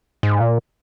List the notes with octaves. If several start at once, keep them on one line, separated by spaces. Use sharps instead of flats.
G#2
A#2